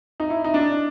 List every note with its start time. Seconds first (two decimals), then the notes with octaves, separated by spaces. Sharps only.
0.20 D#4
0.30 E4
0.44 D#4
0.54 D4